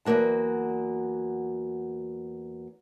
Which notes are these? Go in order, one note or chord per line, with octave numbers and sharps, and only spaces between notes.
E2 F#3 A#3 F#4 A5